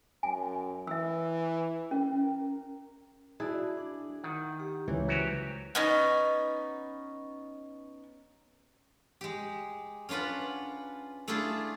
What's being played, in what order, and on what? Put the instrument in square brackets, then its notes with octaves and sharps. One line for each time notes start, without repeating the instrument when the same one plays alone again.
[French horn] F#2 [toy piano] G#5
[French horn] E3 [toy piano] E5 E6
[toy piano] C#4 [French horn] A#4
[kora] E4 G#4 [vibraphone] F#4 D5 [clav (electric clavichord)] A5
[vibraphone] D4
[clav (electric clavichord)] D#3 [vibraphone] F#5
[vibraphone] G4
[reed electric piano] C#2 [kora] E3 [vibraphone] E4 C#5
[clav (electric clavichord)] F#3 F#4 G4 [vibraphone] B4 C5
[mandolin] B3 C#4 D#4
[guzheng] G#3 G4
C#4 D4 F4 B4 F#5
A3 D4 E4 F4 G#4